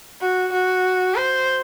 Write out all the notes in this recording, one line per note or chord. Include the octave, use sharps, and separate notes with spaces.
F#4
F#4
C5